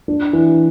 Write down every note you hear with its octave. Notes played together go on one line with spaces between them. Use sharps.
D4
E3